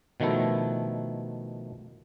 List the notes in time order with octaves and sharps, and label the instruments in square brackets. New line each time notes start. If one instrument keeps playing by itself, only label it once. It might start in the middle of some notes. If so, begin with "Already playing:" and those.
[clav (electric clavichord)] B2 D#3 F3 A3 E4